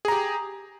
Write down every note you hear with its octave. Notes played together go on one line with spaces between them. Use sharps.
G4 G#4 A#5